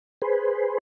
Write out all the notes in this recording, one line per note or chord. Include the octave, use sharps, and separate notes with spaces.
G#4 B4 C5